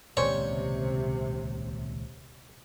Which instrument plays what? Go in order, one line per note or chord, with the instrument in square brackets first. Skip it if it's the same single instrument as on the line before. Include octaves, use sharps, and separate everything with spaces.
[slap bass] D#1 C#2 [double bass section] C3 [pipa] G3 C#4 C5 [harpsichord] C#5